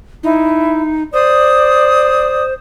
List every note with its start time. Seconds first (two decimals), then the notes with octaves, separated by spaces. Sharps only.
0.23 D#4 E4
1.13 C5 D5 D#6